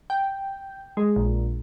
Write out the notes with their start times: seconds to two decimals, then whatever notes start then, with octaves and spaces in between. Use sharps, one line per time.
0.10 G5
0.97 G#3
1.16 A#1